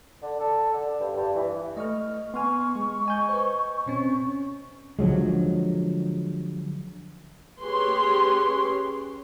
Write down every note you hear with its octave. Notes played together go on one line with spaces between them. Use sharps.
D3
A4
D3
G2
G2
E3
A3 D#5 C#6 F6
B3 G#5 C6 C#6 F6
G#3
D#5 G#5 G6
B4 C5
B2 C4 C#4
D3 F3 F#3 G#3
C#4 G4 G#4 B4 C#5 C6